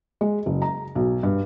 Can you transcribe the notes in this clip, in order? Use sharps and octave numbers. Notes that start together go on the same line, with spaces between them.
G#3
F#1
A#5
B1
G2